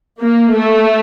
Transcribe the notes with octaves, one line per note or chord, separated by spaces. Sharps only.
A#3
A3